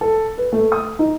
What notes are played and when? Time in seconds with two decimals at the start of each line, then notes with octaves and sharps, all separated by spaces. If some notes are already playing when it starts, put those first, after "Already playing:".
0.01 A4
0.38 B4
0.52 A3
0.72 D#6
0.99 D#4